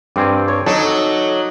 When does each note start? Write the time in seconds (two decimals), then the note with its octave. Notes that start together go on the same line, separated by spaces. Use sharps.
0.16 G2 C4 D5 G#5
0.48 C#5
0.66 F#3 D#4 A4 D5